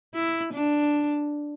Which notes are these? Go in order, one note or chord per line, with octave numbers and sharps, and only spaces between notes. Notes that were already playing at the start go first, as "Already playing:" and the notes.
E4
D4